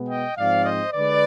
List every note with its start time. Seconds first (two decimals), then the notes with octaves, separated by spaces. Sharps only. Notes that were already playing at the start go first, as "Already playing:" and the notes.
Already playing: B2 G#3 B3
0.08 D#5 G5
0.37 G#2 F3 C4 D5 F5
0.65 C5 D#5
0.93 D3 G#3 B4 D5